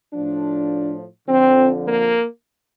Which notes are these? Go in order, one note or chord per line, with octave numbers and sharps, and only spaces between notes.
A2 F3 D4
F2 D3 F3 C4
A#3